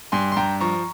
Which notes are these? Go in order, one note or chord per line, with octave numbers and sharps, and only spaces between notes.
G2 G#5 C6
C6
G2 G5 A#5
F3 A#5 C#6